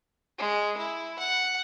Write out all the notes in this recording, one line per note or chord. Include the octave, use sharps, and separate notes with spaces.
G#3
E4
F#5